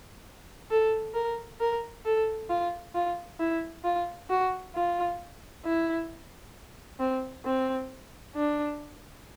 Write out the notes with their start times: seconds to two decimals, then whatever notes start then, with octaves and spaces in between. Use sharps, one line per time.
0.71 A4
1.14 A#4
1.60 A#4
2.05 A4
2.49 F4
2.94 F4
3.39 E4
3.84 F4
4.30 F#4
4.75 F4
5.65 E4
6.99 C4
7.45 C4
8.35 D4